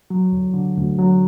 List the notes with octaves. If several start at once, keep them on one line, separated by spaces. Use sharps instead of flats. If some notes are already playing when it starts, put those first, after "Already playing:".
F#3
D2
D3
D2
F#3